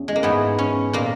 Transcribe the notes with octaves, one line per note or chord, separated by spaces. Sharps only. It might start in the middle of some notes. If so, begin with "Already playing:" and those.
Already playing: E2 C#4
G#3
A#3
G#2 E3 B3
C#4
A#2 A#3